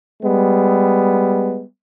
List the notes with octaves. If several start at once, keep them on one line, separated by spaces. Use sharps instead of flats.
G3 G#3 B3